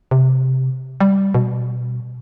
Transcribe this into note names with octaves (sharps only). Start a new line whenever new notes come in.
C3
G3
B2